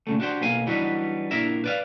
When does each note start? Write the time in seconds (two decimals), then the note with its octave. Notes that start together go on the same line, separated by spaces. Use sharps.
0.07 A#2 C#3 A3
0.20 D4 F#4 G4 C5
0.41 B1 A#3 F5 G#5
0.66 E3 F#3 G3 B3 D4 D#4
1.31 A#2 D4 E4 A#4 E5
1.64 B4 D5 F5